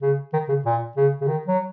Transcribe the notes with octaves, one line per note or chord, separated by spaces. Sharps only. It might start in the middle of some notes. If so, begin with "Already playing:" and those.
C#3
D#3
C#3
A#2
C#3
C#3
D#3
F#3